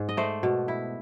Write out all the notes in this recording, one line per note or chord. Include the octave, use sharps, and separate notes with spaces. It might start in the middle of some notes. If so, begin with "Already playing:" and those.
Already playing: G#2
D#5
A3 C5 D5
B2
E4